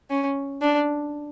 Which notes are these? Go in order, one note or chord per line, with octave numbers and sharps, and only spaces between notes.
C#4
D4